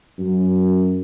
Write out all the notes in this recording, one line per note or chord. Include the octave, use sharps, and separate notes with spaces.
F#2